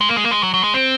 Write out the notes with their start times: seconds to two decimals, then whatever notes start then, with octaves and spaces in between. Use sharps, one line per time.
0.01 G#3
0.09 A#3
0.17 G#3
0.24 A#3
0.31 G#3
0.43 F#3
0.54 F#3
0.63 G#3
0.74 C4